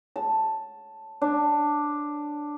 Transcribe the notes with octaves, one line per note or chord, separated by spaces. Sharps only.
A5
D4